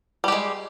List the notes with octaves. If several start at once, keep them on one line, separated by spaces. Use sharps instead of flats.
G3 G#3 G4